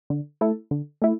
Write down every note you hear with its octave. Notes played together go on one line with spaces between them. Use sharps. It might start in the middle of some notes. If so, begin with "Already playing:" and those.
D3
A3 E4 A4
D3
A3 E4